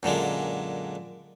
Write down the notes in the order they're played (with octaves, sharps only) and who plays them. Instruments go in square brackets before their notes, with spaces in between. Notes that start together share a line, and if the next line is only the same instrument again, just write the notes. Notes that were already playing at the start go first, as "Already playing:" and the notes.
[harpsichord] F#2 A#2 D3 G#3